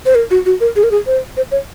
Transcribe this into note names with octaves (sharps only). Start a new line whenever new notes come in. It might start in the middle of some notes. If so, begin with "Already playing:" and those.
C5
A#4
F#4
F#4
A#4
G#4
A#4
G#4
C5
C5
C#5